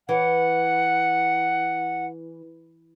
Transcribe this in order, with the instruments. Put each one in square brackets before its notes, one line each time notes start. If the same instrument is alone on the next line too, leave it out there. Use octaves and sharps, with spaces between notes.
[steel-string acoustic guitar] E3 [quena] F#5